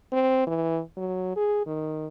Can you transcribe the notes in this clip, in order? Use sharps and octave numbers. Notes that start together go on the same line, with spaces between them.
C4
E3
F#3
G#4
D#3